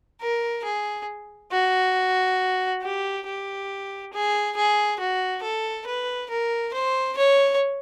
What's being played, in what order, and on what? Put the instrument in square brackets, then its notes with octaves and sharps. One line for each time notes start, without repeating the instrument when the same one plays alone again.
[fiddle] A#4
G#4
F#4
G4
G4
G#4
G#4
F#4
A4
B4
A#4
C5
C#5